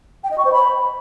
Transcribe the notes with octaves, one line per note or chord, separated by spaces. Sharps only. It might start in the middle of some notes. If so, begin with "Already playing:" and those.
G5
D#5
C#6
C5
B5